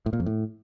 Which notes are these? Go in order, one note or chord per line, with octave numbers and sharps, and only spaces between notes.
A2
A#2
F2
A2